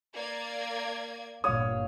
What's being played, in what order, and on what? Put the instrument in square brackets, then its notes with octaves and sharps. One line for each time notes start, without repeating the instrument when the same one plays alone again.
[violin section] A#3 D5 G#6
[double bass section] G1 G2 A#2 [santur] C#5 F5 [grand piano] D#6